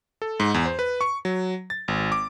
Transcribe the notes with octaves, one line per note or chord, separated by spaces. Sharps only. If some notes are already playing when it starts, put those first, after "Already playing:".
A4
G#2
E2
C5
B4
C#6
F#3
A6
G#1
D6